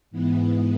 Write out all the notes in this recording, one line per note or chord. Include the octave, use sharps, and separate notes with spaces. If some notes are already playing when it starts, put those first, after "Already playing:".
G#2 E3 B3